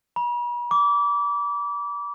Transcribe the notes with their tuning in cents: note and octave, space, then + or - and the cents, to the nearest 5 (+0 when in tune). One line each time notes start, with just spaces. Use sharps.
B5 -45
D6 -25